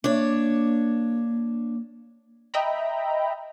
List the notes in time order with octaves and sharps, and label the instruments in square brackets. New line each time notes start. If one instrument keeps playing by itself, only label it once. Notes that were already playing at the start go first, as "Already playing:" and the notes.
[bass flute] A#3 [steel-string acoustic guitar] D4 C#5
[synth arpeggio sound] D#5 E5 G5 A#5 B5